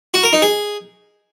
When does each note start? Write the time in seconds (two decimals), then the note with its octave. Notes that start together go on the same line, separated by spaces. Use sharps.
0.14 F#4
0.23 A#4
0.33 D#4
0.42 G#4